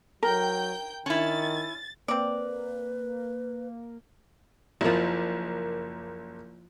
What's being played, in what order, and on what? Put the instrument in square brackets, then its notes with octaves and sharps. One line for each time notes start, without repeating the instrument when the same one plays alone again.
[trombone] F#3 [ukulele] A#4 [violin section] G5 G6
[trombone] D#3 [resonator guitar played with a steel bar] C#4 E4 [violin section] A6
[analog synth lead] A#3 [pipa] C4 D5 [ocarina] B4
[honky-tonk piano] F#1 A#3 [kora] F3 E4